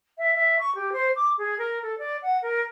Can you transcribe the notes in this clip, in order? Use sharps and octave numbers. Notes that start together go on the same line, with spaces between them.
E5
E5
C#6
G4
C5
D6
G#4
A#4
A4
D5
F#5
A#4